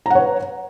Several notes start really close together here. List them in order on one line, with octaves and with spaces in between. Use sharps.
A#5 F#5 C#5 B4